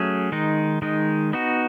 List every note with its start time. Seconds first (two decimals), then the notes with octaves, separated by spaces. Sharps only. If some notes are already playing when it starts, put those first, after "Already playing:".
Already playing: F#3 A3 C#4 G#4
0.32 D#3 G#3 D#4
0.82 D#3 G#3 D#4
1.33 B3 D#4 F#4